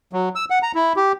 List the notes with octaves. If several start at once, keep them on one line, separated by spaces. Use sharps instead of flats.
F#3
E6
F#5
A#5
E4
G4